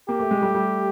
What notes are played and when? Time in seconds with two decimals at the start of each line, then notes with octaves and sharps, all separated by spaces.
0.09 A#3 G4
0.20 A3
0.31 G#3
0.42 G3 A3
0.55 G3 A3